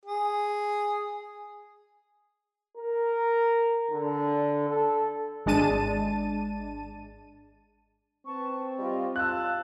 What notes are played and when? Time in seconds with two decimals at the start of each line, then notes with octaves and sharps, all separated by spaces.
0.05 G#4
2.77 A#4
3.91 D3
4.69 A4
5.46 G#1 G#3 D4 A5 D#7
8.26 C4 B4 A5 C#6
8.79 G3 F4 D#5
9.16 F4 A5 E6 F#6